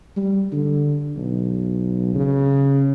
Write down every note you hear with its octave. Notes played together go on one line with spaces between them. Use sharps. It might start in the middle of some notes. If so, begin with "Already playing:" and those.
G3
D3
B1
C#3